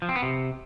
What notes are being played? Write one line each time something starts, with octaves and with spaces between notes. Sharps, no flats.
F3
C4
B3
C3